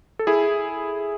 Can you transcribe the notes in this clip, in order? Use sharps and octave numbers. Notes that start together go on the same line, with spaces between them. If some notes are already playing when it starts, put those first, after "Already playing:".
A4
E4 G#4